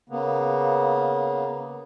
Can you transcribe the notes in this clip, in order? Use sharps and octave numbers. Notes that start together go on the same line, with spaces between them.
C#3 A#3 B3